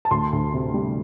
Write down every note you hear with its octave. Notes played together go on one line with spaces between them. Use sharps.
A5
D2 C6
D2
C3
G3